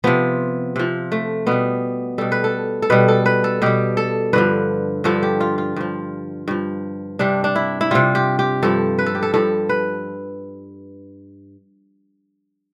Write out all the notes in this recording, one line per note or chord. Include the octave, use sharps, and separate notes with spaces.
C3 F3 B3
C3 F3
A3
B2 G3 B3
B2 G3 A4
B4
A4
A4
B2 G3 B4
A4
B4
A4
B2 G3 G4
A4
G2 D3 F3 B4
G2 D3 F3 A4
G4
F4
F4
G2 F3
G2 F3
C3 G3 D4
D4
E4
E4
C3 G3 F4
G4
G4
G2 F3 A4
B4
A4
G4
A4
G2 F3 A4
B4